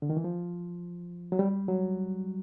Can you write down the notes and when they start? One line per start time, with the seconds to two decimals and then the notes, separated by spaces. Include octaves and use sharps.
0.02 D3
0.10 D#3
0.17 E3
0.24 F3
1.32 F#3
1.39 G3
1.68 F#3